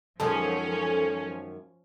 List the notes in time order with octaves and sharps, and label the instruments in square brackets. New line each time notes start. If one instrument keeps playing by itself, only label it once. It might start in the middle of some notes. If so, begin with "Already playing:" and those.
[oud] F#2 D#3 G#3 [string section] F3 C#4 [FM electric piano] A4